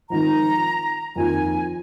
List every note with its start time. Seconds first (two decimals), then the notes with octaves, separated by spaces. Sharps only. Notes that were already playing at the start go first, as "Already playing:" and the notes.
0.09 G#1 G#2 F3 A#5
1.16 F2 D#3 A#3 F4 G#5